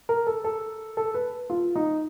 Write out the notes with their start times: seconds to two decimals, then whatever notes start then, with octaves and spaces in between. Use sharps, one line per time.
0.09 A#4
0.27 A4
0.44 A4
0.97 A4
1.14 B4
1.50 F4
1.76 D#4